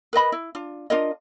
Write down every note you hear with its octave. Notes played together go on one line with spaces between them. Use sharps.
A#4 B4 D#5 B5
E4
D4 F4
D4 F4 A#4 D#5